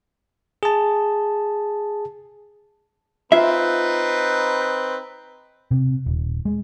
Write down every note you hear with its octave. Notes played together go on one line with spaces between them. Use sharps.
G#4 A5
C4 D#4 F4 B4 E5
C3
D#1
G#3